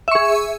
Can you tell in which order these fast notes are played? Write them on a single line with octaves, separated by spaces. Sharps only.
E5 C#6 G#4